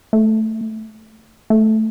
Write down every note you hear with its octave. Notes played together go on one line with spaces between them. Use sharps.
A3
A3